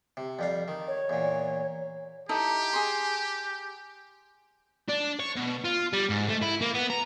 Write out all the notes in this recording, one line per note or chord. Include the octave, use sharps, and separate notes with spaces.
C3
F2 G3 F5
D#3
C#5
E2 A#2
D#4 E4 G4 A4
G#4 C6
D4
C#5
B2
F4
G3
G#2
A3
E4
A#3
B3
A#5